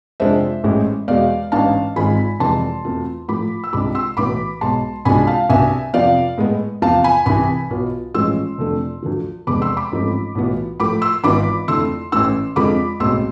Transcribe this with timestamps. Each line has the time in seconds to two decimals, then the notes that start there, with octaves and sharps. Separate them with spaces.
0.20 F2 C3 G#3 D4 F4 C5 E5
0.64 A1 A2 E3 G#3
1.08 E2 B2 G#3 D5 F5
1.52 A1 G#2 E3 B3 D4 F5 A5
1.96 G#1 G#2 G#3 C4 F4 G#5 B5
2.40 F1 F2 E3 G#3 A5 C6
2.84 E2 B2 A3 C4 F4
3.28 A2 F3 A3 B5 D6
3.64 E6
3.73 C2 C3 G#3 D4 F4 B5 D6
3.95 C6 E6
4.17 B1 A2 E3 B3 B5 D6
4.61 B1 B2 G#3 A5 C6
5.05 C2 B2 G#3 D4 F4 G#5 B5
5.27 F5 A5
5.50 C2 B2 B3 D4 E5 G#5
5.93 F2 C3 F3 B3 D5 F5
6.38 A2 G#3 B3
6.82 E2 C3 F3 F5 A5
7.04 G#5 B5
7.26 C2 C3 E3 G#5 B5
7.70 B1 B2 B3 F4
8.14 A1 A2 F3 G#3 C6 E6
8.58 F1 F2 D3 A3 D4
9.03 D2 D3 F3
9.47 F1 E2 D3 G#3 C4 B5 D6
9.62 C6 E6
9.77 B5 D6
9.92 A1 G#2 F3 A3 C4
10.35 B1 A2 E3 B3 F4
10.80 A2 F3 A3 B5 D6
11.01 C6 E6
11.24 G#1 G#2 E3 B3 F4 B5 D6
11.68 F2 D3 A3 E4 C6 E6
12.12 A1 A2 E3 C6 E6
12.56 F2 D3 G#3 C4 F4 B5 D6
13.00 B1 A2 G#3 C4 C6 E6